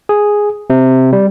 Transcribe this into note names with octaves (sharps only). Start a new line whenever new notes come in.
G#4
C3
G3